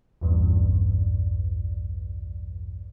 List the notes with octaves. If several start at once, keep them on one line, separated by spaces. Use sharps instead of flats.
A#1 E2 G2